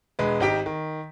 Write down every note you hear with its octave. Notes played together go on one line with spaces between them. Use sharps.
E1 G#3 B4
G#1 D#4 G4 G5 B6
D#3